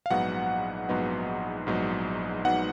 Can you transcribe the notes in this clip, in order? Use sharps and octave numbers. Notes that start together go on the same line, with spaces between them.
F5
A#1 G#2 F#3 B3 D#4 F#5
A#1 G#2 F#3 B3 D#4
A#1 G#2 F#3 B3 D#4
F#3 B3 D#4 F#5